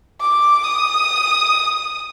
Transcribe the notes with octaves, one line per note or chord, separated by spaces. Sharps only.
D6
D#6